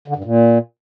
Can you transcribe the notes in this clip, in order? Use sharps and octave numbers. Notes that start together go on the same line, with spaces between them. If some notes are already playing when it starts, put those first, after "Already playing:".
D3
G2
A#2